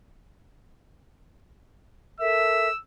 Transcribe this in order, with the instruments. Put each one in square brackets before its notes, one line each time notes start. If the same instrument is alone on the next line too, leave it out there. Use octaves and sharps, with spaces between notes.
[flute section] A4 A#4 E5 [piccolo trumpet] E6